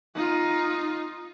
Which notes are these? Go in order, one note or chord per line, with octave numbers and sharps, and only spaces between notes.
D#4 F4